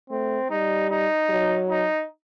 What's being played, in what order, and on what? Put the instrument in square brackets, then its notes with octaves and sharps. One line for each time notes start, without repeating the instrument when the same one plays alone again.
[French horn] A3 [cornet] C4
[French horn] G3 [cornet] D#4
[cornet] D#4
[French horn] F#3
[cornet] D#4